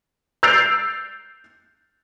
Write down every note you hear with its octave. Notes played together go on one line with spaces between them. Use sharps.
E6 G6 A6 C7 D7 F7